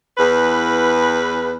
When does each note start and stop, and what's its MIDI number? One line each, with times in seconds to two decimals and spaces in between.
0.18 1.57 40
0.18 1.57 71